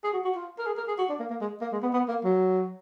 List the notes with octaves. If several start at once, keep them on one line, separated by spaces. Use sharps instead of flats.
G#4
F#4
F#4
F4
A#4
G#4
A#4
G#4
F#4
D4
A#3
A#3
G#3
A#3
G#3
B3
B3
A#3
F#3